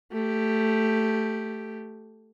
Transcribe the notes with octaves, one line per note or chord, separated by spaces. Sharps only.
A3 G4